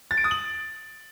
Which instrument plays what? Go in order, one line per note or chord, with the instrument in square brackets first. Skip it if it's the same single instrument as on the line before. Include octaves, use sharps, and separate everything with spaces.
[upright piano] A6
D7
D#6
F#7